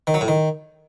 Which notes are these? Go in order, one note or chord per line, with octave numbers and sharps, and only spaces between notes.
D#3
F#3
A2
D#3